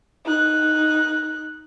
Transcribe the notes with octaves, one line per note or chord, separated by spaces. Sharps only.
D#4 F#6